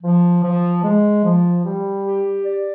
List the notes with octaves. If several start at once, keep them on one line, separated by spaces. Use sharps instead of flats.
F3
F3
G#3
F3
G3
G4
D5